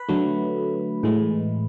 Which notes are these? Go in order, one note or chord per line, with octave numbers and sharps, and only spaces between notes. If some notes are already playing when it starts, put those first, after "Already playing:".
Already playing: B4 B5
D3 F#3 A3
A2 E3 G#3